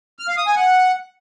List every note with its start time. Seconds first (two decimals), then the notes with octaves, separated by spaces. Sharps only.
0.19 F6
0.28 F5
0.38 D#6
0.47 G#5
0.56 F#5